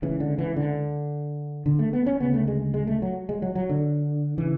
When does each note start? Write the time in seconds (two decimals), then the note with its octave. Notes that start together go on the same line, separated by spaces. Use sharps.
0.02 C#2 C#3 E3
0.20 D3
0.38 E3
0.56 D3
1.66 D3
1.79 A3
1.93 B3
2.06 C#4
2.20 D2 C#3 B3
2.34 A3
2.48 G#3
2.74 G#3
2.87 A3
3.02 F#3
3.29 G#3
3.42 F#3
3.55 F#3
3.69 D3
4.38 C#3 E3